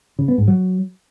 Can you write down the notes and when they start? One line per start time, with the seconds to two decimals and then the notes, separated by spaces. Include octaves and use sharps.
0.19 C#3
0.28 B3
0.38 G#2
0.48 F#3